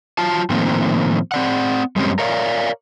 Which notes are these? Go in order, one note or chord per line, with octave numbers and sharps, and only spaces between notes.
F#3 F4 A5
A2 D#3 F3 A#3 C4
C4 D5 F#5
F#2 G3 G#3 C4 C#4
A#4 C#5 D5 F5